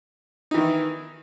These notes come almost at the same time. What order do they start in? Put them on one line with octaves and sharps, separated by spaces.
D#4 E3 D#3 E4